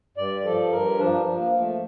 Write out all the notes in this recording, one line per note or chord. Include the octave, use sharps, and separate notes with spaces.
G2 D5
F3 A4
G2 A#4
F3 D4
F3
A#3
F3
A3